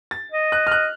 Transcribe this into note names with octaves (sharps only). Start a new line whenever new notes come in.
A6
D#5
F#6
F6
F#6